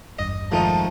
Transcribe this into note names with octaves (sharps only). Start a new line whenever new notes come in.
G#1 E2 G2 D#5
D#3 F3 G#3 A3 D#4 A5